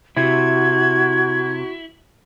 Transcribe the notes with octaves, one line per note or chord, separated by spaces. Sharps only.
C3 E4 F#4 G#6